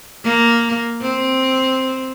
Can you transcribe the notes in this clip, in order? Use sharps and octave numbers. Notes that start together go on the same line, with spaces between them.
A#3
C4